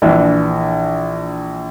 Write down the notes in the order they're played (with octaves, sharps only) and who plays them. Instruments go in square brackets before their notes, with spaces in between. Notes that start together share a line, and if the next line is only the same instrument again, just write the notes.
[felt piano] A#1 E3 D4 E5